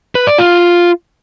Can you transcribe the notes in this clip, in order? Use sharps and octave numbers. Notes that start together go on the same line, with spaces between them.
B4
D5
F4